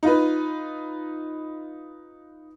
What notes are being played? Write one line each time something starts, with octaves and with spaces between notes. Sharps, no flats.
D#4 F4 B4